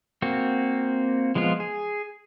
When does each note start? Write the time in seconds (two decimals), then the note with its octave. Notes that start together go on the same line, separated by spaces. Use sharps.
0.22 A#3 C4 F#4
1.35 F3 G#3 B3 F4
1.60 G#4